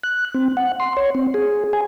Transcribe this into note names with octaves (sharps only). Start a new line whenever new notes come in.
F#6
C4
F#5
C6
C#5
C4
G#4
G#5